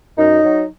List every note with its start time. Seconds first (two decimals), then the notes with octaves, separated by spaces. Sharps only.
0.18 F#2 D#4
0.44 F#3